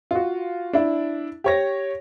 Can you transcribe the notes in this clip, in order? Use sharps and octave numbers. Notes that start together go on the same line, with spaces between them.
F4 F#4
D4 E4
G4 C#5 A#6